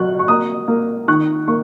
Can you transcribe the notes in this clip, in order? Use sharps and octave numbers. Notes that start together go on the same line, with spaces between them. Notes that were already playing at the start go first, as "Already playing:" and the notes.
Already playing: F#3 C#6 F#6
C#6
A#3 A#5 D#6
A#3
D#3 C#6 F#6
A#3 C#6